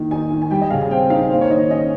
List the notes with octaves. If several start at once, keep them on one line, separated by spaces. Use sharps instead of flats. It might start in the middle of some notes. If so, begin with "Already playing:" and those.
Already playing: D#3 A#3
D#4 G#5
D#3
G#5
G3 G5
D#5
C#3 F5
G#5
C4 G5
D#4 F5
A#3 C5
C#5
D#3 D#5
C#4 D#5